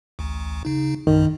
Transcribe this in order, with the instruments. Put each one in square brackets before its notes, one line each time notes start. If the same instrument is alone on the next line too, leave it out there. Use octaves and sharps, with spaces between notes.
[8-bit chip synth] A1 D2
C#3 D#4
[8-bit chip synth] A#1 F#2 [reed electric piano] D#3